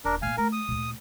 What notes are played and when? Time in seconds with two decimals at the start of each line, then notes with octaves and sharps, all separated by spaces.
0.05 D#1 D4 A#4
0.22 A#2 A#3 F5 G#5
0.37 A3 A#4
0.52 D#6
0.68 D2 A#2